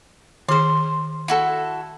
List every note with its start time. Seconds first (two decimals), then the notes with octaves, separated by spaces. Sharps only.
0.48 D#3 G#4 C5 C6
1.28 E4 F#4 A4